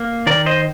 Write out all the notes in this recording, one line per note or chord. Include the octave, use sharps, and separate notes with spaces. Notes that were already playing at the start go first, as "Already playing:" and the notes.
Already playing: A#3
D#3 A#4 D5
C5 D#5